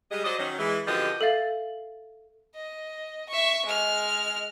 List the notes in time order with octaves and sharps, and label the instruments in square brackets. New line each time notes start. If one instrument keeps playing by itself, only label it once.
[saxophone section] G3 G#3 D#5
F#3 C5 D5 D#5
D#3 F#3 C#4
E3 G#3
F#2 D3 F3 G4 B4 D#5
[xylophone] A4 E5 F5 A6
[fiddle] D#5
E5 C#6
G#3 F6